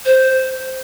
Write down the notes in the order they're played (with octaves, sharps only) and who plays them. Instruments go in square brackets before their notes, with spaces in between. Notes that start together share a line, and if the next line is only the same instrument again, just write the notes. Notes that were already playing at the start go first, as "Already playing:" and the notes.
[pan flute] C5